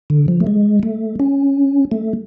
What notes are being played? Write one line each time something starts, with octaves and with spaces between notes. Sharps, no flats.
D3
F3
A3
G#3
A3
C#4
A3